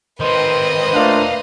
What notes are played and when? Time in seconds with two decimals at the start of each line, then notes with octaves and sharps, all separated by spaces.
0.20 D#3 C4 B4 C5 D#5
0.94 A#2 A3 D4 F5 F#5